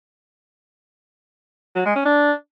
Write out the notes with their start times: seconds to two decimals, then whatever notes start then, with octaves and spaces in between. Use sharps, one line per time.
1.76 F#3
1.86 G#3
1.96 C#4
2.06 D4